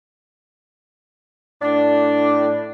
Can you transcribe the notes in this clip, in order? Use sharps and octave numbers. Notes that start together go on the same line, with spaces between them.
A2 D4